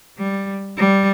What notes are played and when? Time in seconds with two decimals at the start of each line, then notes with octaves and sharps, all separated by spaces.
0.18 G3
0.77 G3